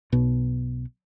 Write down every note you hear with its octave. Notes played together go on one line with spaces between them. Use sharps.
B1 B2